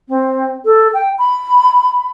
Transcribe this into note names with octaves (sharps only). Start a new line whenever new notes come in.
C4
A4
G5
B5